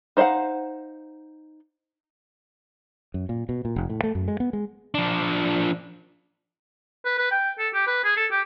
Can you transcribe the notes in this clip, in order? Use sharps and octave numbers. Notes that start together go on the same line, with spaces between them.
D#4 C5 D#5 F5 F#5
F#2
A#2
B2
A#2
F1
A2
A3
F#2
G#3
B3
G#3
F3 D4
B4
B4
G5
A4
G4
B4
G#4
A4
G4